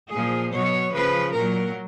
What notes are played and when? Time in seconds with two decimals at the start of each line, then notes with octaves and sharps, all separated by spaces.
0.11 A#2 F3 G#4
0.52 B2 F#3 C#5
0.92 C#3 F3 B4
1.33 A#2 F#3 A#4